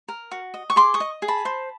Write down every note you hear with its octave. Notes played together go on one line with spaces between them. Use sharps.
A#4
F#4
D#5
C#6
G#4 C6 D6
C#6 D#6
D#5
G#4
A5 B5
C5